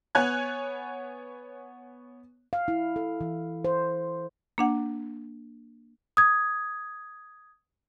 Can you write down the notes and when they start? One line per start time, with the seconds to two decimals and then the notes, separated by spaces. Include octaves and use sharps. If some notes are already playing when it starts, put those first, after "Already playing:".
0.15 B3 C#5 G#5 F#6 G#6
2.53 F5
2.68 E4
2.96 A4
3.21 E3
3.65 C5
4.58 A#3 D4 F#5
6.17 D#6 G#6